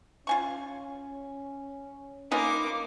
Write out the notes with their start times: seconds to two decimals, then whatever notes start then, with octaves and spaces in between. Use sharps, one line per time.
0.27 C#4 F4 G#5 C#6
2.31 A#3 C#4 D#4 F4 B4 D6